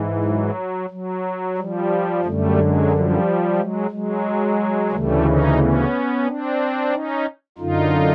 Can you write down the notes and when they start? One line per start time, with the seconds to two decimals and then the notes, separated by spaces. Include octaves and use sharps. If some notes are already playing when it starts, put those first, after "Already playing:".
Already playing: G#2 E3
0.24 F#3
0.90 F#3
1.57 F3 G3
2.24 F#2 D3 G3 A3
2.57 F#3 G#3
2.91 F3 G3
3.57 F#3 G#3
3.91 F#3 G#3
4.91 D2 C#3 E3 G3 A3
5.24 C#4 D#4
5.58 B3 C#4
6.25 C4 D4
6.91 C#4 D#4
7.58 F#2 D3 D#4 F4